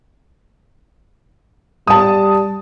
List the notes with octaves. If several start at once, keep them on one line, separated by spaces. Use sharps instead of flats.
G3 A5 D#6